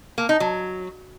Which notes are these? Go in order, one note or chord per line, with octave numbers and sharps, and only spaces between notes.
A#3
D#4
F#3